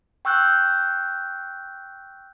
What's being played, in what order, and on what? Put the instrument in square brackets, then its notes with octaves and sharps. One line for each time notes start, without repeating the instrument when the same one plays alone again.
[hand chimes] G5 C#6 E6 F#6 G6